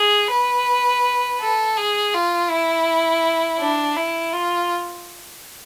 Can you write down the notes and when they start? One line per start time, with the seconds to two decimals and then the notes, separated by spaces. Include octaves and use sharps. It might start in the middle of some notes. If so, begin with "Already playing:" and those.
Already playing: G#4
0.31 B4
1.40 A4
1.77 G#4
2.14 F4
2.50 E4
3.60 D4
3.96 E4
4.33 F4